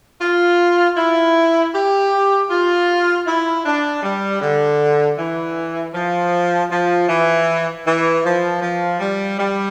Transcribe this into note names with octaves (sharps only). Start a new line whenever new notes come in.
F4
E4
G4
F4
E4
D4
G3
D3
E3
F3
F3
E3
E3
F3
F3
G3
G3